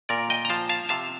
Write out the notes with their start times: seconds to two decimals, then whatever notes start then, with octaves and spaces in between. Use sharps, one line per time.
0.09 A#2 A#4 D5
0.30 D#5 G5
0.45 A#5
0.49 F3 F5 A5
0.69 F5 A5
0.89 C3 F5 A5